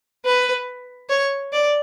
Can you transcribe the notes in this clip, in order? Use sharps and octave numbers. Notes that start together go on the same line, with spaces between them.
B4
C#5
D5